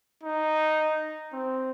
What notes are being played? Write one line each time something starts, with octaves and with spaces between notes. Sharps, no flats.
D#4
C4